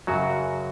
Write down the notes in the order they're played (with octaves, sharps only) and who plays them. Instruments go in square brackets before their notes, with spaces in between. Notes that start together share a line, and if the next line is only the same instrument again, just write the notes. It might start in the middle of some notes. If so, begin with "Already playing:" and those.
[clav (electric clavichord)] F#2 C#3 F#3 F#4